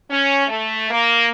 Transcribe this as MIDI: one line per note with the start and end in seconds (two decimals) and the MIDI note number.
0.10 0.43 61
0.47 0.88 57
0.90 1.27 58